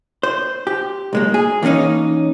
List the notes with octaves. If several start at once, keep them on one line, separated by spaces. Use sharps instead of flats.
C5
G4
B1 G#3 A#3
G#4
E3 A#3 C4 C#4 D#4